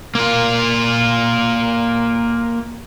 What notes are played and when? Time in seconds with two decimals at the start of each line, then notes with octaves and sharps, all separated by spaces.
0.15 A#3 F4